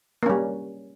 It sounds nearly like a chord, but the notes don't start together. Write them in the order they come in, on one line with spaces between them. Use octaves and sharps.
A#3 C#4 G3